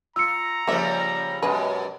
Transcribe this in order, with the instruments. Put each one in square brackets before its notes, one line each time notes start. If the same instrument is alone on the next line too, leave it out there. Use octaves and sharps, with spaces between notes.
[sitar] F4 [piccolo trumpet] A#5 [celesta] E6 C#7
[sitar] C#3 F3 G3 [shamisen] A#3 E5
[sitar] F#2 B2 [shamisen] G#3 G#4 B4